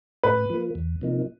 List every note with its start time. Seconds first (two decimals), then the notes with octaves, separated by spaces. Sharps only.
0.23 A2 B4
0.50 F3 A#3
0.75 E2
1.01 C3 F3 A#3 D#4